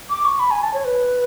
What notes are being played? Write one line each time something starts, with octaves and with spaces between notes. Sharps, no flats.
D6
C#6
B5
G#5
A5
C#5
B4